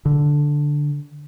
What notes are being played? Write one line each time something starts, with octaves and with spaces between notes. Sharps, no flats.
D3